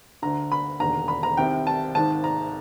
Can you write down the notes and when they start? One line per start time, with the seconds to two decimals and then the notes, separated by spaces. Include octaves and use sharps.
0.22 D2 D3 A#5
0.52 B5
0.80 E1 D#2 D3 A#5
1.08 B5
1.23 A#5
1.37 C2 C3 D#3 G5
1.67 A5
1.95 G#1 G#2 D#3 A5
2.24 A#5